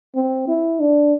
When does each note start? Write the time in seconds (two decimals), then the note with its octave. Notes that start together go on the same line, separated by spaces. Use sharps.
0.15 C4
0.48 E4
0.80 D4